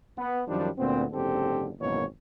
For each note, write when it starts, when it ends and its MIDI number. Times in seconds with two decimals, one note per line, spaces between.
0.18 0.42 59
0.48 0.68 42
0.48 0.68 51
0.48 0.68 53
0.48 0.68 55
0.48 0.68 62
0.78 1.05 38
0.78 1.05 46
0.78 1.05 59
0.78 1.05 60
1.13 1.70 30
1.13 1.70 44
1.13 1.70 50
1.13 1.70 60
1.13 1.70 67
1.13 1.70 69
1.80 2.04 32
1.80 2.04 42
1.80 2.04 47
1.80 2.04 52
1.80 2.04 58
1.80 2.04 73